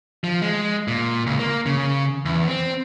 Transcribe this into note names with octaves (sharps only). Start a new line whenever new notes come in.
F3
G#3
A#2
C#2
A#3
C#3
E2
C4